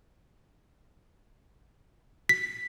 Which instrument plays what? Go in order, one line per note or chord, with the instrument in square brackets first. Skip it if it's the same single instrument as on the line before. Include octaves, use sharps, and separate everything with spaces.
[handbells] B6